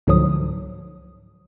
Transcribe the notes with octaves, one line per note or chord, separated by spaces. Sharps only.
C#2 G#2 D3 F3 F#3 D#6